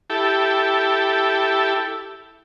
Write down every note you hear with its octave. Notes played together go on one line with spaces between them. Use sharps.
E4 G4 A4